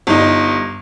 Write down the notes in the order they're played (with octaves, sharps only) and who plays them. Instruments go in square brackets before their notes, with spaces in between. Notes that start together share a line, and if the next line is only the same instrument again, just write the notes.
[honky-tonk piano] G1 D#4